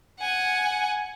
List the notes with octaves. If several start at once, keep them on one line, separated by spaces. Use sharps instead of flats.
F#5 G#5